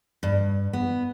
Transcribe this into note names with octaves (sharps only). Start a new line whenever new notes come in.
G2
B3